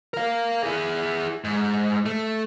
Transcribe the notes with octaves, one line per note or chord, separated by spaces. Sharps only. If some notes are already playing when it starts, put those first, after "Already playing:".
A#4 F5
E4 G#4
G#2
A3